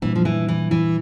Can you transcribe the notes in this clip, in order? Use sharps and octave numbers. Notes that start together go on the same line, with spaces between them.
A#2 E3 G3 A#3 D4
F3
E3
E3
E3